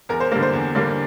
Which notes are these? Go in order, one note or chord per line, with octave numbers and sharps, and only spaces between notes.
E2 A#4
C5
D3 G3 A#3 A#4
C5
E2
D3 G3 A#3